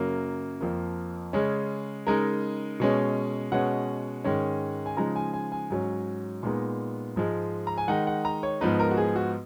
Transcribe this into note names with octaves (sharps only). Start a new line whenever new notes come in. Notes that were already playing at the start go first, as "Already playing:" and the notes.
Already playing: F#2 C#3 F#3 A#3 A#4
F2 F3 A#3
C#3 G#3 C#4
C#3 G#3 D#4 A#4
B2 G#3 C#4
B2 G#3 C#4 F#5
G#2 D#3 G#3 C#4
G#5
C#3 F3 G#3 D#4 A#5
G#5
G#5
G#5
G#2 F#3 C#4
A#2 G#3 B3 D#4
G#2 F3 G#3
A#5
G#5
D#3 G#3 D#4 F#5
F#5
A#5
C#5
G#2 F3 B3 D#4 B4
A#4
F#4
G#4
F#4